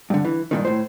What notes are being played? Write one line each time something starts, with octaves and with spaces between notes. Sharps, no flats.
G2 D3
E3
G2 A#2 D#3
A2 C5